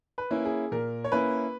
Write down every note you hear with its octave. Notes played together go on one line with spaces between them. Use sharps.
B4
A#3 C#4 E4
G#4
A#2 A#4
C#5
A#3 C#4 E4 B4